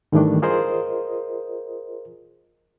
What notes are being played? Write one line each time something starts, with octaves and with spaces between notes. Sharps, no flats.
G#2 D#3 E3 G3 A3 D4
F4 G#4 A#4 C5 D#5